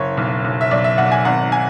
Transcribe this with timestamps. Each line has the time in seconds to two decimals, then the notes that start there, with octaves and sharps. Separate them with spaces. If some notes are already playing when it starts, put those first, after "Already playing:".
Already playing: F#1 C#5
0.17 B1
0.44 B1
0.61 E5
0.71 B1 D5
0.84 E5
0.98 B1 F#5
1.12 G#5
1.25 G#1 F#5
1.52 G#5